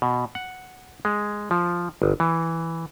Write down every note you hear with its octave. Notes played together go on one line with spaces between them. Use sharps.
B2
F#5
G#3
F3
G1
E3